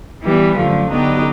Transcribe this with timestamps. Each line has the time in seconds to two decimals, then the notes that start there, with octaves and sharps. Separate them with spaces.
0.24 E3 G3 B3
0.56 F#2 D3 F3 A3
0.89 D3 F#3 B3 D#4 G4